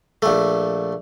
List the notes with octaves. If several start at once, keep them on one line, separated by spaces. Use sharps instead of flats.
A#1 A3